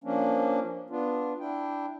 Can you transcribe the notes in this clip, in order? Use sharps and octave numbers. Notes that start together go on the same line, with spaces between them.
F3 A#3 C#4 D4
B3 D4 F4
D4 E4 G5